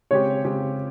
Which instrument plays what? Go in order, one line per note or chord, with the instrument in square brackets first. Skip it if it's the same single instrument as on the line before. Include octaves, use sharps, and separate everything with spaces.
[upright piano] C#3 G#3 C4 G4 [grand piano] C#5
[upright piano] C#3 G#3 C4 G4